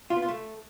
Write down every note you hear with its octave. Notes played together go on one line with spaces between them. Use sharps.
F4
B3
F4
A3